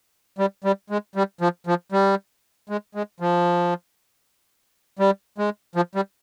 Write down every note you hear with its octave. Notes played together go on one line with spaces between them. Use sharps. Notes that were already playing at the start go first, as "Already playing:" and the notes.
G3
G3
G#3
G3
F3
F3
G3
G#3
G#3
F3
G3
G#3
F3
G3